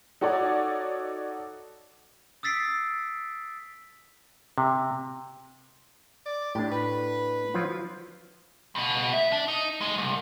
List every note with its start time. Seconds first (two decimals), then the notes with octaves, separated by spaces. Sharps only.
0.21 D#4 F#4 A4 C#5 D5
2.43 D#6 E6 A6 B6 C7 D7
4.58 C3
6.26 D5
6.55 A2 D4 G4
6.71 B4
7.54 F3 F#3 F4
8.75 C#2 B2
9.13 E5
9.32 D4
9.48 D#4
9.81 G2 G#3
9.98 C2 G#2